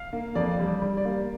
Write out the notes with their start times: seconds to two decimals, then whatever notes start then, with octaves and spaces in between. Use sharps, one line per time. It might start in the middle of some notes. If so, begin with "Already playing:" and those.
Already playing: F5
0.13 A#3
0.35 F2 D5
0.59 G3
0.67 D5
0.82 G3
0.97 D5
1.05 A#3